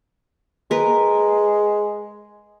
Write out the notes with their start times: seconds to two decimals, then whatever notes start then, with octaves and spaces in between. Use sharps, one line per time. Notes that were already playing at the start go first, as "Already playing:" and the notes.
0.71 G#3 A#4 B4